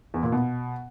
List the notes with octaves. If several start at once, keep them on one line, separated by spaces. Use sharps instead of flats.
E2
A#2
B2